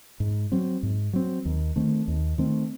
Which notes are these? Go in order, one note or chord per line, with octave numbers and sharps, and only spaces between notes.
G#2
F#3 C4
G#2
F#3 C4
D#2
D#3 A3 C4
D#2
D#3 A3 C4